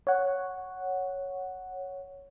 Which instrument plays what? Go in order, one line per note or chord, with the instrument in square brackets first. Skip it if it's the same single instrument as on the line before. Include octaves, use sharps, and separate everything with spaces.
[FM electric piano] C#5 F#5